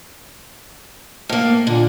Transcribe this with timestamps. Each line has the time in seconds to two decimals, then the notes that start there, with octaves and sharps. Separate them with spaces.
1.29 A2 A#3
1.67 A#2 D3